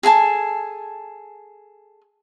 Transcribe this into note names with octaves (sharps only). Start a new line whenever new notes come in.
G#4 A4 G#5 A5